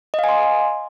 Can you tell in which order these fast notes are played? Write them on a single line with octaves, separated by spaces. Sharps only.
D#5 F5 G#5 C6